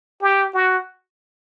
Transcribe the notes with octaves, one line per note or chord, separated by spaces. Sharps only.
G4
F#4